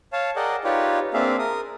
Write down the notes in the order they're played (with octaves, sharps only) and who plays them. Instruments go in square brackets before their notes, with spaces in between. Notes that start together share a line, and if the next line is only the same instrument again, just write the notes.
[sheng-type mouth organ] C#5 F5 A5
G#4 A#4 D5 D#5 F#5 G5
D#4 F4 G4 B4 C#5 D5
A#3 C4 D4 G#4 E5 F5
A#4 D#6